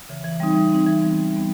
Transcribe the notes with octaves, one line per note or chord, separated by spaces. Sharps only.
C#3 E3
E3
G3 C4 D#4
E3
G3 C4 D#4
E3
G3 B3
E3
G3 B3